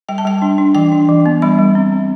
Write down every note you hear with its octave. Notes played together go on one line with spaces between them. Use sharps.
G3 G5
A5
G3 G5
D4
D4
E3 G5
D4
E3
B3
G3 B5
G3
C4
C4